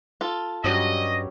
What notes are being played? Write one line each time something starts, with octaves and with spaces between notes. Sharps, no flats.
F4 A4
G2 F#3 G3 C#4 D#5